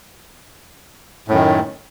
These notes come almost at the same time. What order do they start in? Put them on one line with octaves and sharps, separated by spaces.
A2 F#2 D#3